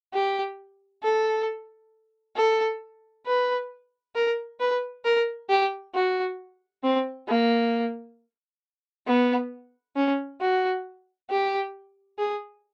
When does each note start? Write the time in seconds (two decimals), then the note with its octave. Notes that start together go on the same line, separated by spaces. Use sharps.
0.14 G4
1.03 A4
2.36 A4
3.26 B4
4.15 A#4
4.60 B4
5.05 A#4
5.50 G4
5.95 F#4
6.84 C4
7.28 A#3
9.07 B3
9.96 C#4
10.41 F#4
11.30 G4
12.19 G#4